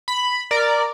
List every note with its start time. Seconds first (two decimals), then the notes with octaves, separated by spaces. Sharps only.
0.08 B5
0.51 A#4 D5